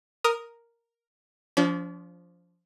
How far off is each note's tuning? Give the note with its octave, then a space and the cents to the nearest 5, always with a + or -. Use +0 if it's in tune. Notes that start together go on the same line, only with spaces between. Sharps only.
A#4 +0 D#6 +0
F3 +0 D4 -45